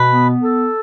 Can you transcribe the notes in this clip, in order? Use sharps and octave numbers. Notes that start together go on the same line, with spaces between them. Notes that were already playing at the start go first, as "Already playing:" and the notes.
Already playing: B2 B4
B3
A4